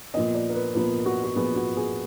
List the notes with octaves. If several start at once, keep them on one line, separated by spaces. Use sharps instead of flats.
A#2 F3 B3 D#5
D5
A#4
B4
A#2 F3 B3 A#4
F#4
F#4
A#2 F3 B3 G#4
F#4
G#4